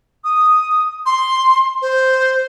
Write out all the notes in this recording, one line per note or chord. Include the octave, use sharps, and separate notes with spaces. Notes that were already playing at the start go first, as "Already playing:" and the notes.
D#6
C6
C5